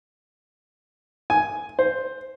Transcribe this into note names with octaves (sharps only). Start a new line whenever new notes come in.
G#5
C5